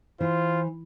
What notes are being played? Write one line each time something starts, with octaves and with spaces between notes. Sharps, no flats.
E3 F4 C5